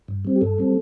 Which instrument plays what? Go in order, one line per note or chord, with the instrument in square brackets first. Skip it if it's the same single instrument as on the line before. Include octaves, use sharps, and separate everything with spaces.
[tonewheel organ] G2
G3 C4
G4
G2 A4
G3 C4